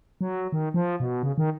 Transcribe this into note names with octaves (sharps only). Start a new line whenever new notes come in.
F#3
D#3
F3
B2
C#3
D#3